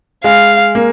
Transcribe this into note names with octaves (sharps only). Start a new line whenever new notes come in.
G#3 F5
A#3